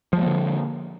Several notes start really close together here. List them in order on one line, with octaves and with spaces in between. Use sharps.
F3 G#3 A#3 D3